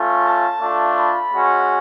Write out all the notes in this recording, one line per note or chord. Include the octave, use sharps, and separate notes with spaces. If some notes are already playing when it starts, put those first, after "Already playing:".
Already playing: A3 C#4 F4
A5
A3 D4 F4
B5
G#3 C#4 F#4